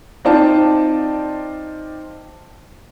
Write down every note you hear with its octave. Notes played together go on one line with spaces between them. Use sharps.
C4 D#4 F4 C5 D5 A5